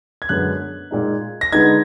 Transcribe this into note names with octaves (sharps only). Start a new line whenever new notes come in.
G#6
F#2 D3 G#3 B3 F#6
A#2 G#3 D#4
A#6
D3 G#3 B3 D#4 G#6